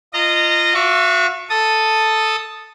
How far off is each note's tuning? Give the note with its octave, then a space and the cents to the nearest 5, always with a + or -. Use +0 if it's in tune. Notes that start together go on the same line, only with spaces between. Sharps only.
F4 -20 D#5 -15 A#5 -20
F#4 -30 E5 +40 C#6 +40
A4 +0 A5 +0 D#6 +0